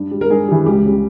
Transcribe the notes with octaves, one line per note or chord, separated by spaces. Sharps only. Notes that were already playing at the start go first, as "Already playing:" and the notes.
Already playing: G2
G3
A#4
G2 G#4
E3 G3
C#2 G4
C#3 G3